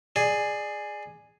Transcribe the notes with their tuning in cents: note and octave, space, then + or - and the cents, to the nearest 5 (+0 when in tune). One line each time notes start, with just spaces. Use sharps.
G#4 +0 D5 +20